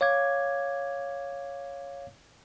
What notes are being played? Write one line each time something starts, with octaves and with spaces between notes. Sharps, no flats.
C#5 F5 D6 G#6